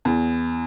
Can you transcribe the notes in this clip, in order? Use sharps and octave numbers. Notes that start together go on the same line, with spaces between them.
E2